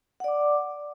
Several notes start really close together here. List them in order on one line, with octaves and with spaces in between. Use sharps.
F#5 D5 D6